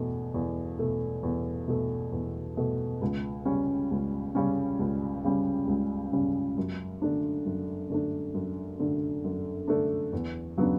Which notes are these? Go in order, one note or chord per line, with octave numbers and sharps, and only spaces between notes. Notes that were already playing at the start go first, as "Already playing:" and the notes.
Already playing: E2 B2 A3
E2
B2 A3
E2
B2 A3
E2
B2 A3
C#2
C#3 G3 C#4
C#2
C#3 G3 C#4
C#2
C#3 G3 C#4
C#2
C#3 G3 C#4
F#2
D3 A3 D4
F#2
D3 A3 D4
F#2
D3 A3 D4
F#2
D3 A3 D4
E2
C#3 F#3 B3 D4